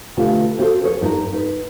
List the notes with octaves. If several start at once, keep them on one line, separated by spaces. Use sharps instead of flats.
B2 D3 A3 F4 G4
C4 E4 F#4 G4 A4 C5
G#4 B4 C#5
G2 D#4 E4 A#4
D#4 B4